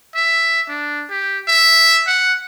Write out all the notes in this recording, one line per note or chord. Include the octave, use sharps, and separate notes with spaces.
E5
D4
G4
E5
F#5